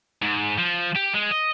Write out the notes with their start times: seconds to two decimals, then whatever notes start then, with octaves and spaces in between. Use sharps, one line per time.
0.22 G#2
0.58 F3
0.96 G4
1.14 G#3
1.32 D#5